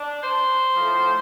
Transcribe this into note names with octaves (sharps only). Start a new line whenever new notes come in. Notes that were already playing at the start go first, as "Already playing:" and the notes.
Already playing: D4
C5
A2 F3